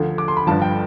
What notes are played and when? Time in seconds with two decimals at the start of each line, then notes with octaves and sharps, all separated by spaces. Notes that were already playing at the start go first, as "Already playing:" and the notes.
Already playing: D2 D3 F3
0.18 D6
0.28 C6
0.37 B5
0.47 G1 G2 F3 A5
0.62 G5